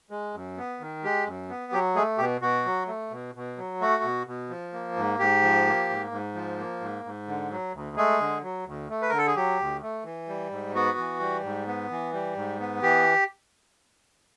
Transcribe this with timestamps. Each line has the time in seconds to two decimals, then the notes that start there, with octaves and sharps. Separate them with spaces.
0.11 G#3
0.34 F#2
0.57 B3
0.80 D#3
1.03 G#3 G4
1.26 F#2
1.49 B3
1.72 F#3 G4
1.96 G#3 A3 G#4
2.18 B2 G4
2.41 B2 F#4
2.65 F#3
2.87 A3
3.11 B2
3.35 B2
3.57 F#3
3.81 A3 F#4
4.03 B2
4.27 B2
4.49 F3
4.73 A#3
4.96 G#2
5.19 G#2 G4
5.43 F3
5.66 A#3
5.89 G#2
6.11 G#2
6.35 F3
6.58 A#3
6.81 G#2
7.04 G#2
7.27 D3
7.51 F#3
7.73 D2
7.97 G#3 A3 G#4
8.20 D3
8.43 F#3
8.66 D2
8.90 A3
9.02 B4
9.09 D3 A#4
9.18 A4
9.27 G#4
9.35 F#3 G4
9.59 D2
9.82 A3
10.04 E3
10.28 G3
10.51 G#2
10.75 B3 F#4
10.98 E3
11.20 G3
11.43 G#2
11.67 B3
11.90 E3
12.13 G3
12.36 G#2
12.60 B3
12.82 E3 G4